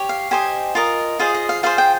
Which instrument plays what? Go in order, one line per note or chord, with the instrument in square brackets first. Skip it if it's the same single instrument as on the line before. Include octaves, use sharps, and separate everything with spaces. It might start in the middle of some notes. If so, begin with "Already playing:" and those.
Already playing: [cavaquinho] G4 C#5
F5
G4 C5 D#5 G#5
F4 A#4 D#5
F4 G#4 C5 D#5 F5
D#5
F5
F4 G#4 C5 F5
G5